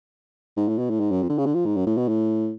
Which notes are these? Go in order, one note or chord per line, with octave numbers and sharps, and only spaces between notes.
G#2
A2
B2
A2
G#2
F#2
F2
D3
C#3
D3
F3
G#2
F#2
A2
B2
A2